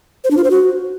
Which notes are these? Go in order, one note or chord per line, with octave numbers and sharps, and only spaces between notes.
C5
D4
F4
C5
F#4